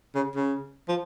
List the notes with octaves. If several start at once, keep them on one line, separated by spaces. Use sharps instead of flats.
C#3
C#3
F3